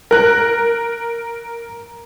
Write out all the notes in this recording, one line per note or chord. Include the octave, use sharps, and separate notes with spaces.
A#4 F#6